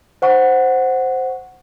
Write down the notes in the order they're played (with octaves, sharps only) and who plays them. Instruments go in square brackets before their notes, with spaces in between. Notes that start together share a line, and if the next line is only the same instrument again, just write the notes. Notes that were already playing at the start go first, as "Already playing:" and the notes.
[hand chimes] C5 F#5 C#6